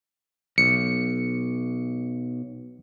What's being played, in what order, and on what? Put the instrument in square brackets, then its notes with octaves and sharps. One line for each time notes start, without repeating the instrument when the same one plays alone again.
[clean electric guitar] B1 [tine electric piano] C#7